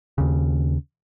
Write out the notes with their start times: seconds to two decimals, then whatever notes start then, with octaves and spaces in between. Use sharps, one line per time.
0.18 D#2 C#3